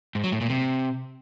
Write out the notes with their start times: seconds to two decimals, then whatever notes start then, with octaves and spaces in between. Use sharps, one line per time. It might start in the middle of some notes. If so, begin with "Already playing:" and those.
0.15 G#2
0.24 F#3
0.32 A2
0.41 A#2
0.50 C3